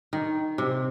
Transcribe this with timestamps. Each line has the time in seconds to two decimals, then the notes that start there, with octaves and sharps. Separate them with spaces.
0.13 D#3
0.58 C3